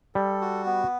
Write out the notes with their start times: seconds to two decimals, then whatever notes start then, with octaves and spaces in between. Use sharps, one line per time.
0.15 G3 A4
0.41 F#4
0.66 B3